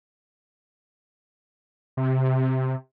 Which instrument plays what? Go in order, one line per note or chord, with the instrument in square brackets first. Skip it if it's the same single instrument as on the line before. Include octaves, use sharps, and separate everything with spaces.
[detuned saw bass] C3